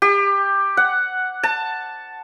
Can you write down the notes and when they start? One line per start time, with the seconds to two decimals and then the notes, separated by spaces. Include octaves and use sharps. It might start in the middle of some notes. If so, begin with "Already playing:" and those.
0.02 G4
0.77 F#5
1.43 A5